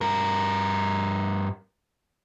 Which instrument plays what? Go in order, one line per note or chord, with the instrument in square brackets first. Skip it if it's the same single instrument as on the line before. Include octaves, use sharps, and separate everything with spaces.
[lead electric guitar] G2 A#4